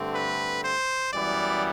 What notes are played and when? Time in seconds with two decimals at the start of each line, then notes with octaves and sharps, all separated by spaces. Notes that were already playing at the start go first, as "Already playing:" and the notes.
Already playing: G2 D3 A3 C4
0.15 B4
0.64 C5
1.13 F#2 E3 G3 B3 D5